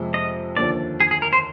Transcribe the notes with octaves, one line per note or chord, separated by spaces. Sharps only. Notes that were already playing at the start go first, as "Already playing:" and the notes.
Already playing: F2 C3 F3 G#3
D#5
D#2 D3 F3 D5
G#4
G#4
A#4
C5